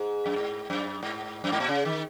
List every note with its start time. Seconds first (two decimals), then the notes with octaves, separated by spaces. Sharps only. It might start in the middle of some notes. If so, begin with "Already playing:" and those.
Already playing: G#2
0.26 F#2
0.36 G#2
0.70 F#2
1.03 G#2
1.44 F#2
1.52 G#2
1.60 A#2
1.69 C#3
1.85 D#3